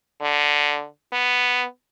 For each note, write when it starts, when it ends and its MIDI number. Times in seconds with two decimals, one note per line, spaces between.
0.21 0.86 50
1.13 1.65 59